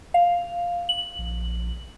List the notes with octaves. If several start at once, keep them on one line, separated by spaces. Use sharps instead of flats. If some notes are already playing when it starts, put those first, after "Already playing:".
F5
F#7
A#1